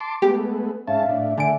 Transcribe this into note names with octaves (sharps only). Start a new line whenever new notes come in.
A5 C6 D6
G#3 A3 B3 G4
G#2 C#4 E5 F5 A5
A2 D4
D3 A3 G#5 D7